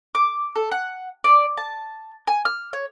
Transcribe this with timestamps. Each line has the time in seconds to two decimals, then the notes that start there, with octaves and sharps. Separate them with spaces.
0.15 D6
0.56 A4
0.71 F#5
1.24 D5
1.57 A5
2.27 G#5
2.45 F6
2.73 C#5